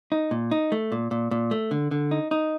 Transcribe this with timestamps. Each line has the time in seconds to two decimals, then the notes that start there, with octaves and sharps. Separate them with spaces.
0.12 D#4
0.31 A#2
0.51 D#4
0.72 A3
0.92 A#2
1.11 A#2
1.31 A#2
1.51 A3
1.71 D3
1.91 D3
2.11 D#4
2.31 D#4